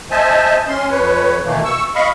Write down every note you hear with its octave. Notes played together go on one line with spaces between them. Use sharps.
C5 D#5 E5 G#5 A5
C#4 C6
F2 B4 C#5
B2 D#3 E3 A3 A#3
C#6 E6
D#5 F5 B5 C#6